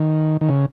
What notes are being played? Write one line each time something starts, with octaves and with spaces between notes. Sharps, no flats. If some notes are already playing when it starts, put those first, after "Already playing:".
Already playing: D#3
D#3
C#3